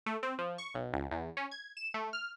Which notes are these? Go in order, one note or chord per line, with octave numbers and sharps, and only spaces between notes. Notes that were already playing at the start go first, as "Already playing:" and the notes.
A3
C4
F3
C#6
B1
C#2
E2
C#4
G#6
E7
A3
F6